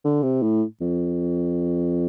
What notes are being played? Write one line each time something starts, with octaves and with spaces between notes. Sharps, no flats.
D3
C3
A2
F2